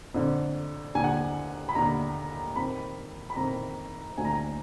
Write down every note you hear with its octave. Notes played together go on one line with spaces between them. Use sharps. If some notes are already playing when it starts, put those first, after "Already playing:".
F2 D3
D#2 D3 G#5
F#5
G#5
B5
D#2 D3 A#5
F2 D#3 B5
B5
F2 D#3 A#5
D2 D3 G#5
A#5
G#5